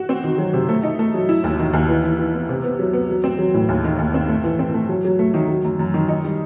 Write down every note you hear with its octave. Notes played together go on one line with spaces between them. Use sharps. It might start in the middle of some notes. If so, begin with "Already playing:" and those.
Already playing: F#4
C4
D#3
F#3
C3
A3
D#4
A3
F#3
E4
D#2
D#3
D#2
E3
E4
E3
B3
C3
B3
F#3
B3
F#3
C4
F#3
A2
D#2
D#3
D#2
C4
A3
E3
C4
A3
F#3
F#3
A3
D#3
F#3
F#2
F#2
D#3
D#4
G3